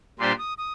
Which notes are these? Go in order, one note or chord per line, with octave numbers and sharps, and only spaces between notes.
A#2 G3 D4 G4 C5 C6
D#6
D#6